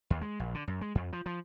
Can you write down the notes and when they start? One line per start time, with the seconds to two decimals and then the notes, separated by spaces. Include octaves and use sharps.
0.10 D#2
0.21 G#3
0.40 A#1
0.54 D3
0.68 F#2
0.81 G#3
0.95 F2
1.13 F3
1.26 F3